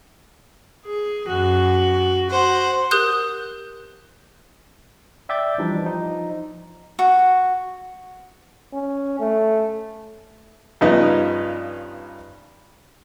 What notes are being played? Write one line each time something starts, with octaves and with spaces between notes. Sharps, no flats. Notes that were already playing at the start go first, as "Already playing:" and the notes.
G#4
F#2 F#4
F#4 C5 F#5
G4 A#4 D#6 F#6 G6
D5 E5 G5 D6 G6 A6
E3 F3 G3 D4 D#4
F3 D#4
F#4
C#4
A3
G2 C#3 F3 B3 D#4